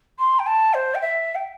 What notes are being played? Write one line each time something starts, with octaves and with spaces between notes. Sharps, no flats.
C6
G5
A5
C5
G5
E5
G5